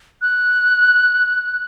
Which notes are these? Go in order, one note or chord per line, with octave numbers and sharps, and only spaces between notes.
F#6